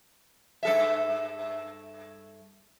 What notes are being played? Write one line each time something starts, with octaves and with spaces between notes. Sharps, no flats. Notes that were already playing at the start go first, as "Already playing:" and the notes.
G2 A4 E5